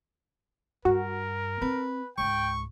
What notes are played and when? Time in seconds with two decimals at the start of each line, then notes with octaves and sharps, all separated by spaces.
0.85 G2 F#4 A#4
1.62 C4 B4
2.18 C#2 G#2 G5 C#6